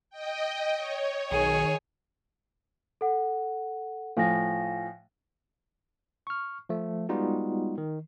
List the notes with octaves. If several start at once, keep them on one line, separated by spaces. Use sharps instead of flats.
D#5 G5
C#5
B1 D#3 G#4
A4 F#5
A2 F3 F5 G#5 A#6
C#6 F6
F3 A3
G3 G#3 B3 D#4 F4 F#4
D#3